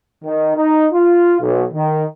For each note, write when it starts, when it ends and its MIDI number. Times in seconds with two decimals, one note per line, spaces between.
0.24 0.55 51
0.56 0.86 63
0.93 1.35 65
1.40 1.63 35
1.73 2.04 51